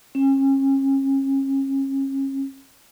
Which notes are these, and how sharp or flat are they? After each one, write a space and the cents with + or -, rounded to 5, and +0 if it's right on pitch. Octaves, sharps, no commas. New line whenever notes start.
C#4 -35